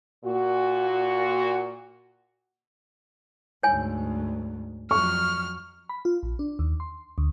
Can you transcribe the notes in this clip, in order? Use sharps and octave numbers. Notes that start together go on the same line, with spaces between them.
A#2 F#4
D2 G#2 C#5 G#5
F2 F#3 C#6 F6
B5
F4
A#1
D4
D#2
C6
D2